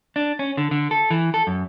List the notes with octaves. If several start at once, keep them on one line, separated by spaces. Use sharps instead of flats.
D4
C#4
D3
D3
A4
E3
A4
F#2